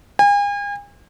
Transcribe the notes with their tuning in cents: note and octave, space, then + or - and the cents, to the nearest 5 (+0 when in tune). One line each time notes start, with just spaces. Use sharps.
G#5 -40